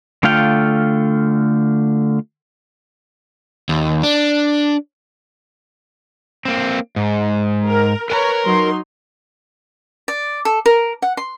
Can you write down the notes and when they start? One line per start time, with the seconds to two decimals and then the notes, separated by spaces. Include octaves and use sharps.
0.23 D3 A3 F4 F5 G5
3.69 D#2
4.03 D4
6.45 A#3 C4
6.96 G#2
7.65 A#4
8.10 A#4 B4 C#5 G#5 A#5
8.46 F#3 D#4 C6
10.08 D5
10.45 A4
10.66 A#4
11.02 F#5
11.17 C6